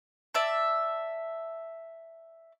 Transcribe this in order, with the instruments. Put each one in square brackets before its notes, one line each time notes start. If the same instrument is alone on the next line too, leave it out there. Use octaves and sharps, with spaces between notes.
[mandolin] D5 E5 A5